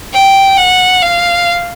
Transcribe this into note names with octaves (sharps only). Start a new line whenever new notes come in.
G5
F#5
F5